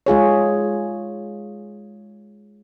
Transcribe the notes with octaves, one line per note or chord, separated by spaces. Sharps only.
G#3 F4 G#4 C#5